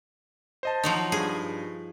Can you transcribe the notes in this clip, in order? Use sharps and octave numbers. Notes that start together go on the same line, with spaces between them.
C5 D#5 A5
F3 F#3 D#4
G2 G#4